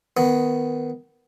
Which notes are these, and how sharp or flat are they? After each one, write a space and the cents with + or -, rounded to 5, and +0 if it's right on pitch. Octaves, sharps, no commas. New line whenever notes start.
D#3 +0 B3 +10